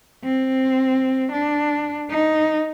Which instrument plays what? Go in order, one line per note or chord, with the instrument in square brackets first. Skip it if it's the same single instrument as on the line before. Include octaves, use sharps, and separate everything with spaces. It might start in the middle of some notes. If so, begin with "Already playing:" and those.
[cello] C4
D4
D#4